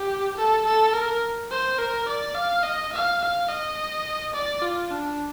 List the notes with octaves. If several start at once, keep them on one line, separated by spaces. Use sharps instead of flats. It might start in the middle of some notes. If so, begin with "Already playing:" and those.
Already playing: G4
A4
A4
A#4
C5
A#4
D5
F5
D#5
F5
F5
D#5
D5
F4
D4